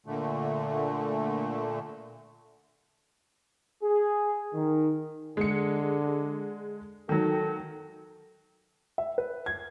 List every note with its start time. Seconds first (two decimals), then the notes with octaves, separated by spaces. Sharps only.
0.06 A#2 D3 A3
3.83 G#4
4.53 D#3
5.37 D3 G#3 C#7
7.09 D#3 F#3 A4
8.98 E5
9.18 B4
9.46 G#6